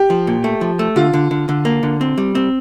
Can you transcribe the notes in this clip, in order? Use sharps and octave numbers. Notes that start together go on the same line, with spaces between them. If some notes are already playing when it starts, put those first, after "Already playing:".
Already playing: G4
F3
A#2
A3
F3
A3
D3 F4
D3
D3
D3
A#3
D3
C4
G3
C4